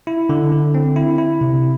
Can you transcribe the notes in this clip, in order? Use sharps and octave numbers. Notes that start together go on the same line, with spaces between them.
E4
D3
D3
C4
E4
E4
C3